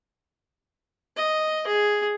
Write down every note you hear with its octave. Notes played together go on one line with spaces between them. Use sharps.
D#5
G#4